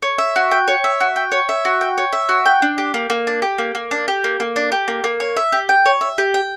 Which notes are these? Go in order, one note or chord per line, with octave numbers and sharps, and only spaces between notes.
C#5
E5
F#4
G5
C#5
E5
F#4
G5
C#5
E5
F#4
G5
C#5
E5
F#4
G5
D4
G4
A#3
A#3
D4
G4
A#3
A#3
D4
G4
A#3
A#3
D4
G4
A#3
A#3
C#5
E5
G4
G5
C#5
E5
G4
G5